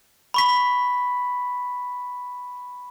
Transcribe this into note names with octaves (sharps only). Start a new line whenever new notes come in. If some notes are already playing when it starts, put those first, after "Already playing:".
B5 C#6 B6